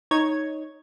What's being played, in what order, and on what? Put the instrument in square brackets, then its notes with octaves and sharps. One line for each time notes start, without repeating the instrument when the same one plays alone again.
[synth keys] D#4 C#5 G#6